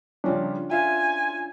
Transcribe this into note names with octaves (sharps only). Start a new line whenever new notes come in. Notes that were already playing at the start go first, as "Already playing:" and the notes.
C#3 F3 G3 C#4 D4
F4 E5 F5 G#5